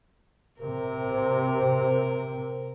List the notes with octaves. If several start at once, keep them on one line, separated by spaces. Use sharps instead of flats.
C3 A#4